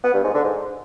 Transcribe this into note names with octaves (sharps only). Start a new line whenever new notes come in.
B3
G2
G#2
D3
G#2